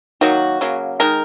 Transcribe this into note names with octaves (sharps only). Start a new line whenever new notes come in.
D#3 F#3 A#3 F#4
C#3 F#3 A#3
D#3 G#3 A#4